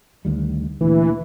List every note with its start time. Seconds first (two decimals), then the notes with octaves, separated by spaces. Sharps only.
0.25 D2 D#3 G3
0.81 D2 A#2 E3